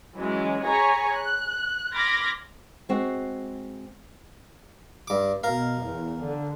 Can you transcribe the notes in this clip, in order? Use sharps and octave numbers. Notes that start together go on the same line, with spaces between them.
E3 F#3 G#3 C#4
G#4 C#5 G#5 A#5 B5 C#6
F#6
B5 C6 D6 F6 G#6 A#6
G#3 C4 F#4
G2 D6
B2 A#4 F5
E2
D3